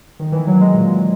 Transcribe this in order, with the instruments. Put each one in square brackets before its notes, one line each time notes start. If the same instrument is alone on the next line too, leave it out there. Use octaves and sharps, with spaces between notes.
[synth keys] D#3
E3
F#3
G#3
A#2